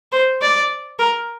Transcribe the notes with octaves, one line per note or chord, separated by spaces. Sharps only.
C5
D5
A#4